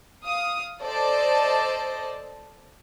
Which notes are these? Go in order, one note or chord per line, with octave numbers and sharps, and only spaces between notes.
F5 D#6
A4 C5 D5 D#5 A5